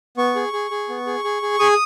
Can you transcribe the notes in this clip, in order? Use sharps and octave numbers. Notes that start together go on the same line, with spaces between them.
B3 C#6
G#4
G#4
G#4
B3
G#4
G#4
G#4
G#4 D#6